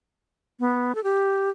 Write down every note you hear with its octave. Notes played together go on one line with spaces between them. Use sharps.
B3
A4
G4